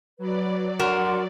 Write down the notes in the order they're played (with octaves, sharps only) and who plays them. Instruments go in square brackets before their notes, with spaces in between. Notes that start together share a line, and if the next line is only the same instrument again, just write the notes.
[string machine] F#3 D5 [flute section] B4
[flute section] D4 F#5 C6 [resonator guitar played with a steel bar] F#4 A#4